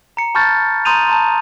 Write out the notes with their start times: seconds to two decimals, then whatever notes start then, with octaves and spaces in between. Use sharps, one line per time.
0.17 A#5 C#7
0.35 A5 B5 C#6 F6 G6 A6
0.85 A#5 C6 D#6 G6 D#7 F7
1.07 A5 A#5 C6